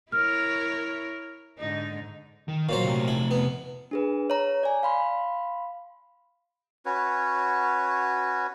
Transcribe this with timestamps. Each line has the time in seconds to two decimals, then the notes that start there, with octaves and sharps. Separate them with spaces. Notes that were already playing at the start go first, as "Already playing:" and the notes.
0.12 E4 A#4 C#5 F6
1.59 G#2 D3 D#4
2.48 D#3
2.69 A#2 F#3 C5 F5
2.84 C3 A3
3.08 E4
3.31 B3
3.91 D4 G#4 B4
4.30 C#5 A#5
4.63 D5 G#5
4.83 F5 B5 C6
6.86 C#4 F#4 B4 C#5